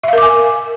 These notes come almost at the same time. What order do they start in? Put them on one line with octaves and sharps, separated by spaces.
E5 F5 A#4 D6 G#5